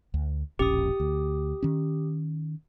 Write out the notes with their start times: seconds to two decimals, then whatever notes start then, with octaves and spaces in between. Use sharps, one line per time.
0.14 D2
0.59 E1 A#1 C#4 G4 D#6
1.00 D2
1.62 D#3 C#4